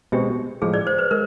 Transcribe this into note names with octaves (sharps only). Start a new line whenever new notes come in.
B2 G#3 C4 G4
A2 F3 G#3 G#4
D5
C5
B4
G#3 A#4